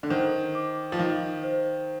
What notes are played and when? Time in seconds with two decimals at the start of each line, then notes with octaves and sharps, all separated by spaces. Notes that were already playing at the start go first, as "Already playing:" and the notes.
0.03 D3
0.10 D#3 C5
0.55 D6
0.92 F3
0.99 D#3 F5
1.44 C5